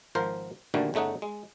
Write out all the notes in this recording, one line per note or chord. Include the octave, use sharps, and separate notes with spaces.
G#1 F3 A#4 C5
D2 A#2 D3 D#3 G3 A3
G1 C#3 A3 D#4 F#5
G#3